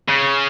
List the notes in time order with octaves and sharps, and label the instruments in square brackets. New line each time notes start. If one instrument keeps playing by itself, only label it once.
[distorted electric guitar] C#3